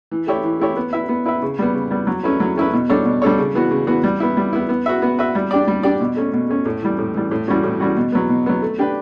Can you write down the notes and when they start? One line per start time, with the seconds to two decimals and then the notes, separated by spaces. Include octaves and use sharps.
0.11 E3
0.27 A3 E4 G4 C#5
0.44 E3
0.60 A3 E4 G4 C#5
0.77 B3
0.93 E4 B4 E5
1.09 B3
1.26 E4 B4 E5
1.42 C#3
1.59 G3 B3
1.74 C#3
1.91 G3 B3
2.07 F#3
2.24 A3 C#4 E4 B4
2.40 F#3
2.56 A3 C#4 E4 B4
2.73 B2
2.89 G3 D4 A4 C#5
3.05 B2
3.22 G3 D4 A4 C#5
3.38 C#3
3.54 E3 B3 F#4
3.71 C#3
3.87 E3 B3 F#4
4.04 G3
4.20 B3 E4
4.37 G3
4.53 B3 E4
4.69 B3
4.86 F#4 B4 E5
5.02 B3
5.19 F#4 B4 E5
5.35 G3
5.51 D4 G4 D5
5.68 G3
5.83 D4 G4 D5
6.01 B2
6.16 A3 C#4
6.33 B2
6.49 A3 C#4
6.65 A2
6.82 E3 G3
6.98 A2
7.14 E3 G3
7.31 A2
7.48 E3 G3 C#4 F#4
7.63 A2
7.80 E3 G3 C#4 F#4
7.97 B2
8.12 F#3 B3
8.29 B2
8.46 F#3 B3
8.62 A3
8.78 D4 G4 B4